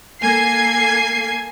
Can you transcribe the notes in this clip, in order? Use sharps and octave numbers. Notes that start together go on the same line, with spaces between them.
A#3 A4 G#5 G#6 C7